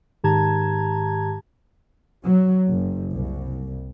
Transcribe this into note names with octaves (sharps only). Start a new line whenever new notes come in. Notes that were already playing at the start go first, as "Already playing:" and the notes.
G#2 D#3 G4 A5 A#5 G#6
F#3
F#1
C2